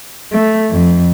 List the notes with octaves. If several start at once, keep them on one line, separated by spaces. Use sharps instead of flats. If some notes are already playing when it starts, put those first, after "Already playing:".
A3
F2